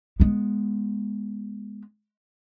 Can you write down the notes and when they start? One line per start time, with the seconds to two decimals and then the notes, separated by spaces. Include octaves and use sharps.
0.20 G#3 B3